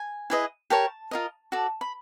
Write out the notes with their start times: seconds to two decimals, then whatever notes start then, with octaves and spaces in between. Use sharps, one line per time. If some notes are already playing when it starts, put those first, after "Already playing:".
Already playing: G#5
0.30 E4 G#4 B4 D#5
0.70 G4 A#4 C#5 A5
1.11 F4 A#4 D#5
1.52 F#4 A4 D5
1.81 B5